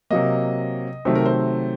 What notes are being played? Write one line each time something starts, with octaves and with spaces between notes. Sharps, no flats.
C3 F#3 A#3 D#5
C3 D#3 F#3 A3 C5
A#4
C5